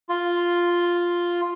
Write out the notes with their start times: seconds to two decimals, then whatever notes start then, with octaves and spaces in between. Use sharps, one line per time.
0.09 F4